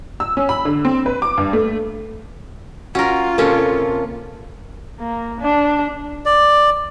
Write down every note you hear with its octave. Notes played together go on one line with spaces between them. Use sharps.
E6
C#4
B5
D3
C4
B4
D6
G2
A3
C#4 F4 F#4 A#4
C3 A#3 C#4 A4
A#3
D4
D5